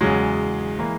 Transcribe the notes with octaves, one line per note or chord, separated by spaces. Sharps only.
E2 C#3 F#3 G#3
E3 G#3 A#3